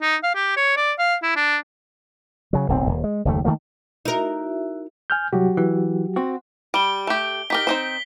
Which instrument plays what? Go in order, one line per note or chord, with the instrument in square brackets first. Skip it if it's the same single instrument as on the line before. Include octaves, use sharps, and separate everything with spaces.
[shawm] D#4
F5
G4
C#5
D5
F5
E4
D4
[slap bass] C#3 F#3
D1 B1 C4
D#1
G#3
F#1 D#2 A3
D#3 F#3 A3 A#3
[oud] D#4 A#4 [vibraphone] E4 F#4 E5
[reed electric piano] G#5 F6 G6
[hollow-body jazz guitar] C2 [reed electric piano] F#3 F#4 G4
[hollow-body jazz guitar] E3
C4 F#4
[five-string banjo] G3 [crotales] D7 G7
[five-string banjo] A3 G4
[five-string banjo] D#4 G4 A#4 [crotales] B6 G7
[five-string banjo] C4 D#4 C5